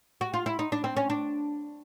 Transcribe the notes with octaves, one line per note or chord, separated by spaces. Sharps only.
F#4
F4
E4
D#4
D4
C4
C#4
D4